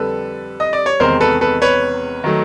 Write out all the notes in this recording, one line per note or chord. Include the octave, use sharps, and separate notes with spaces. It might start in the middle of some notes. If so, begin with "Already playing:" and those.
Already playing: F2 D3 G3 A4 B4
D#5
D5
C#5
E2 C3 D#3 G#3 A#4 C5
A4 B4
A4 B4
B4 C#5
D#3 F#3 A3